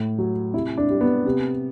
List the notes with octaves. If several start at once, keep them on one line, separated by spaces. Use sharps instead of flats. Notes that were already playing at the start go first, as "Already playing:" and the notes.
Already playing: A2
F#3
C3 E4
D4
G3
B3
C3